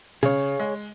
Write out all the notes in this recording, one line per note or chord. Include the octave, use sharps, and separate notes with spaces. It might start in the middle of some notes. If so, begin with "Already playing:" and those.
C#3 G#4 C#5
G#3